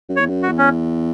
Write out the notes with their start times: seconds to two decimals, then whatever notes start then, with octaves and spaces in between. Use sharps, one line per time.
0.09 F#2
0.16 C#5
0.20 E2
0.29 F#2
0.43 F#4
0.49 E2
0.58 C#4